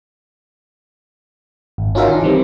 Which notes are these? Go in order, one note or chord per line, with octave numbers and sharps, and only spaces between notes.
G#1
C#4 D#4 F4 F#4 A#4 E5
D#3 D4
D#3 E3 G3 C4